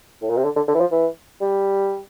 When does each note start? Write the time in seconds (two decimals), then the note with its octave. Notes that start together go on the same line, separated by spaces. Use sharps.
0.22 A2
0.29 A#2
0.37 C3
0.44 D3
0.56 D3
0.68 D3
0.75 E3
0.80 F3
0.92 E3
1.41 G3